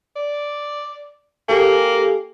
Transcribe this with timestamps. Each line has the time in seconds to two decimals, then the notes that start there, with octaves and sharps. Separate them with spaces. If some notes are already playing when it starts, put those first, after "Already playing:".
0.16 D5
1.48 A#3 G4 A4 G#5